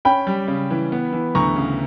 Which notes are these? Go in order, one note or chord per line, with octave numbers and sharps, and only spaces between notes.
C#4 G5 B5
G3
C#3
E3
B3
E3
D2 A#5 C#6
C#3